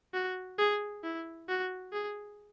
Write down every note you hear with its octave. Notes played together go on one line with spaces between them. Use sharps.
F#4
G#4
E4
F#4
G#4